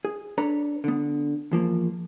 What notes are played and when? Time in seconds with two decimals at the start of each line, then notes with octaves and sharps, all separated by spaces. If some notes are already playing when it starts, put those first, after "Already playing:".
0.05 G#4
0.38 D4 A4 B4 C#5 A#5
0.84 D3 B3
1.52 E2 F3 A#3